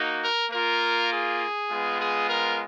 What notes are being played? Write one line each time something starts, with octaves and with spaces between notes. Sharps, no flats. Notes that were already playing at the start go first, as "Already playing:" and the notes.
Already playing: A#3 D#4 F#4
A#4
A#3 F4 A#4
G#4
G#3 B3 F4
G#4
A#4